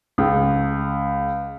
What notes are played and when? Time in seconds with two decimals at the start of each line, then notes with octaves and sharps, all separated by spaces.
0.18 C#2